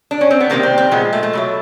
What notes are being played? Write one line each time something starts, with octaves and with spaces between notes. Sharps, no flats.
D4
C#4
C4
B3
C3 D#3 G3 A#3
C4
C4
A#2 F3 G#3 B3
A3
A3
B2 F#3 A3